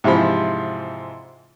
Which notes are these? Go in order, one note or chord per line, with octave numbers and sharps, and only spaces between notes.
G#2 C3 E3 F3 B5